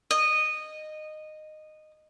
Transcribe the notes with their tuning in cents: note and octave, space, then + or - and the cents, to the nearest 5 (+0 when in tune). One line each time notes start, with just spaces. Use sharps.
D#5 -15